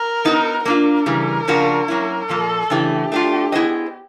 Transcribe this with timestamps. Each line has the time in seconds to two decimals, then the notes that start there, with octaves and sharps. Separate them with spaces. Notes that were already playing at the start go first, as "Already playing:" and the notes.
Already playing: A#4
0.25 B3 D#4 F#4
0.65 A#3 D4 F4 A#4
1.06 C#3 E3 G3
1.48 C#3 F3 A#3 D4 F#4
1.88 F#3 A#3 C#4 E4
2.29 A#2 F3 A#3 A4
2.70 C#3 E3 A3 D4 G4
3.12 A3 D4 F4
3.52 B3 E4 G#4 C5 D#5